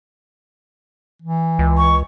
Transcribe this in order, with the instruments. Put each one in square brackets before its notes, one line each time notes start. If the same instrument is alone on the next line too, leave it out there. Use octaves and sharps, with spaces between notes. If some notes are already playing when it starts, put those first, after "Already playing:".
[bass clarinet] E3
[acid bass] C#2
[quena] C#6